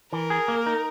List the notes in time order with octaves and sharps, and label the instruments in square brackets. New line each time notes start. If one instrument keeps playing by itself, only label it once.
[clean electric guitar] E3 [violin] A#4
[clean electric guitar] G#4
A#3
D#4